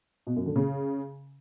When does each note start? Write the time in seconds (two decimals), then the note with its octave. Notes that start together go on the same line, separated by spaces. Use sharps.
0.27 B2
0.36 F#2
0.46 D3
0.56 C#3